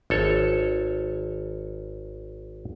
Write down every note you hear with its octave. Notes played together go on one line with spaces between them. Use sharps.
G#1 A4 C#5